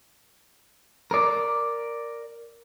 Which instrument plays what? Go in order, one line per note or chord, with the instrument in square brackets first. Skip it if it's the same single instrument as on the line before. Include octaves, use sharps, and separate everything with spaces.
[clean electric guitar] A#4 D5